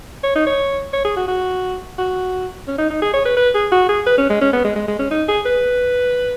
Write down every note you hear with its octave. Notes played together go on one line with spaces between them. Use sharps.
C#5
D#4
C#5
C#5
G#4
F#4
F#4
F#4
C#4
D#4
D#4
G#4
C#5
B4
B4
G#4
F#4
G#4
B4
C#4
G#3
C#4
B3
G#3
G#3
G#3
C#4
D#4
G#4
B4